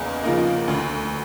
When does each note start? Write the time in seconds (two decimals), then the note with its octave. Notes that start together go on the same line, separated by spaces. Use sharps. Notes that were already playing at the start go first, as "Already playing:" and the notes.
Already playing: E2 C#3 A#3 D#4
0.24 C#3 F3 A#3 D#4
0.68 D2